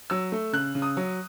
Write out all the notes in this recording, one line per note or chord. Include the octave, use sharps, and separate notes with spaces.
F#3 E6
A3
C#3 F#6
C#3
D#6
F#3